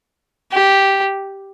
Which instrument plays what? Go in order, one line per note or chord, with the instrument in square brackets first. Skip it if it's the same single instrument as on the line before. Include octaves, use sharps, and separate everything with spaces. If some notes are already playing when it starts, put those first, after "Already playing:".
[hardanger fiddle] G4